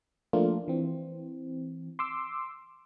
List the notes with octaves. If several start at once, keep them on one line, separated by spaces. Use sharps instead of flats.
F3 A3 A#3 D4 F4
E3 C4
C6 D6 E6